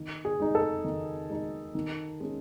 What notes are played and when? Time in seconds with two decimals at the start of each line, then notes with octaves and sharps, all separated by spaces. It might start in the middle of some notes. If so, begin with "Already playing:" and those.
Already playing: D#3
0.25 G#4
0.40 G#3 D#4
0.55 A4
0.84 D#3
1.30 G#3 D#4
1.75 D#3
2.20 G#3 C#4